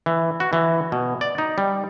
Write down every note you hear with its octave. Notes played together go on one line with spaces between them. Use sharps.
E3
F#4
E3
B2
D5
D#4
G3